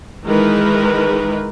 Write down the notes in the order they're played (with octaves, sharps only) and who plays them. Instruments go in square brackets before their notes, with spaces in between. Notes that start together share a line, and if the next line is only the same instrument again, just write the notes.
[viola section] D#3 E3 G#3 D#4 A#4 B4